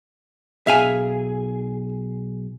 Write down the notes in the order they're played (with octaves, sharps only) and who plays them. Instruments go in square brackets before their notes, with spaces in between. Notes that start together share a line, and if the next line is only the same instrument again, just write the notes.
[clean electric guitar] B1 G#4 [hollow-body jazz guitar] E5 F5 G#5